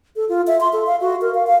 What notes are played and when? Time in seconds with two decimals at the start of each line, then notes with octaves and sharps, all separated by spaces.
0.16 A4
0.29 F4
0.47 E5
0.60 C6
0.73 A4
0.87 F5
1.01 F#4
1.21 A#4
1.34 F5
1.47 F5